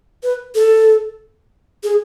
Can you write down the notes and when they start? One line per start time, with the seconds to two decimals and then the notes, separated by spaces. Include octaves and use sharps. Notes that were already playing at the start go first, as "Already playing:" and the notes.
0.23 B4
0.55 A4
1.84 G#4